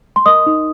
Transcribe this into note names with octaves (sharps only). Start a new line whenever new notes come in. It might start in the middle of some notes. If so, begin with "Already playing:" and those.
C6
A#4 D#5 D#6
D#4